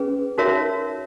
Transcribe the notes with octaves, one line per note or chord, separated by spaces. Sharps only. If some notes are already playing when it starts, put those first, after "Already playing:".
Already playing: C#4 G#4 B4
D#4 F#4 A#4 C#5 E5